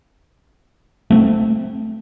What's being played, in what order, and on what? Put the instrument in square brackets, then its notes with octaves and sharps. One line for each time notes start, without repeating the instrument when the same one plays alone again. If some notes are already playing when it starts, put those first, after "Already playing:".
[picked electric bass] A3 C4